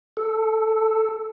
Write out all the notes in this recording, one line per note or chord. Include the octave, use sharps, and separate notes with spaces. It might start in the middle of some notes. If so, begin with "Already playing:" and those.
A4